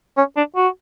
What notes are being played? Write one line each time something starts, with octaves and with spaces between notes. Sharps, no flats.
C#4
D4
F#4